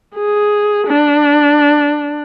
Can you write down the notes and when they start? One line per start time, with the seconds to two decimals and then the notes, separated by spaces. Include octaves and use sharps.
0.15 G#4
0.87 D4